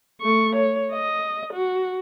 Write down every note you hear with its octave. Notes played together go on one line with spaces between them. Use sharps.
A3 C#6
C#5
D#5
F#4